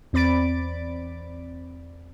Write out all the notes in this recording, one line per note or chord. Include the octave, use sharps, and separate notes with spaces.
E2 C4 D5 B5 A6 D7